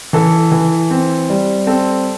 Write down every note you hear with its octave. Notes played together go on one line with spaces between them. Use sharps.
E3 A4
E3
C4
G3
C4 A4